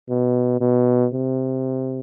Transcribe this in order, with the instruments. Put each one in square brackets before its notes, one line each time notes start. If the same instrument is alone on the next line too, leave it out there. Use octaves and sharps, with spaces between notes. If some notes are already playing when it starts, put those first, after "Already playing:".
[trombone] B2
B2
C3